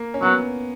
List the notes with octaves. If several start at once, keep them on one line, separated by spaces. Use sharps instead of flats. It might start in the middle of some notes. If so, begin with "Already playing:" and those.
Already playing: A#3
C#4
F#3 B3